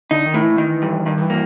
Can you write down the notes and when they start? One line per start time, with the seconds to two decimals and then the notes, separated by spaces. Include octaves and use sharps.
0.11 D3 D#4
0.26 D#3
0.34 A2
0.42 E3
0.58 D#3
0.82 G2
1.06 G2 D#3
1.17 D#3
1.22 E3
1.30 A#3